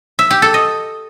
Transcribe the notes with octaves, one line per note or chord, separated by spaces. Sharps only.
E5
G4
A4
D#5